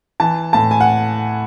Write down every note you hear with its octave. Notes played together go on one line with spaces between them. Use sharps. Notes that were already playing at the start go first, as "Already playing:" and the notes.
E3 A5
A2 A5
G#5
F#5